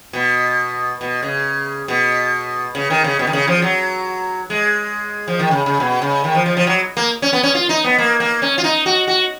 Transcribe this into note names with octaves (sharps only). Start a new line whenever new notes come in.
B2
B2
C#3
B2
C#3
D#3
C#3
B2
D#3
C#3
F3
F#3
G#3
F3
D#3
C#3
C#3
B2
C#3
D#3
F3
F3
F3
F#3
A#3
C#4
B3
C#4
F4
D#4
B3
A#3
A#3
C#4
F4
D#4
F#4
F#4